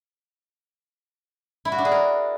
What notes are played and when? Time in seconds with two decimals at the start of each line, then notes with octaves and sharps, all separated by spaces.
1.65 E4
1.72 F#4
1.78 D4
1.85 G#4
1.92 A#4